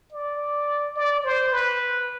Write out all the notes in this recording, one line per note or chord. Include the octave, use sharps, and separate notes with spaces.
D5
D5
C5
B4